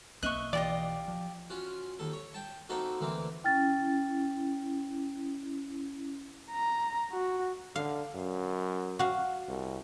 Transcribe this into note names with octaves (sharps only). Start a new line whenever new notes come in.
B1 A#3 C4 D#5 E5 C#6 F#6
E3 F4 G4 D5 D#5
F3
C#4 F4 F#4
D#2 A4
C#5
G5 A5
A#3 C4 D#4 F#4 A4
D2 E3 A#3 C4
C#4 E4 G5 F6 A6
A#5
F#4
D3 F5
F#2
F#4 F5
C2